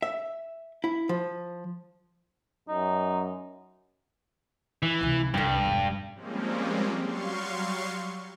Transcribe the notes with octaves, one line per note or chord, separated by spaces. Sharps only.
E5
E4
F3
F#2 D#4
E3
C#2 C3
C2 G2 D3
E1
F3 G3 G#3 A#3 C4 C#4
F#3 G3 F5 C6 C#6